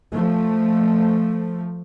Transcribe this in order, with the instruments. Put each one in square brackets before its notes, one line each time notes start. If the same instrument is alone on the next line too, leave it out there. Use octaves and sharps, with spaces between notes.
[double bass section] F3 A3